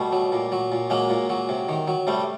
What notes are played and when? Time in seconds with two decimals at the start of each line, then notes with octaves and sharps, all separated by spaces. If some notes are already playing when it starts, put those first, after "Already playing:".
Already playing: B2 G3 A3
0.12 F#3
0.32 A#2
0.52 F#3
0.72 A#2
0.90 F#3 G#3 A#3
1.10 A#2
1.30 F#3
1.49 C3
1.69 D#3
1.88 F#3
2.07 C3 G3 A3